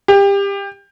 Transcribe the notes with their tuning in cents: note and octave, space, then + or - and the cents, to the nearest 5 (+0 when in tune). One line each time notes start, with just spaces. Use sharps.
G4 +25